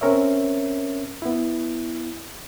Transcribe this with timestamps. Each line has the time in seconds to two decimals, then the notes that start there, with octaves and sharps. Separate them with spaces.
0.01 C4 C#4 A#4 C#5 E5
1.22 B3 E4